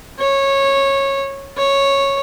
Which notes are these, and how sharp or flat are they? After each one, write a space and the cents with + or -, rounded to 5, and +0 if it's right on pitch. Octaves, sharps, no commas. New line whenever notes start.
C#5 -15
C#5 -5